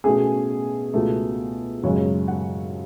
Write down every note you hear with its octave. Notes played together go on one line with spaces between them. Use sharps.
B2 A3 C#4 G#4
C#2 B2 A3
F#2 C#3 G#3 C#5
F#5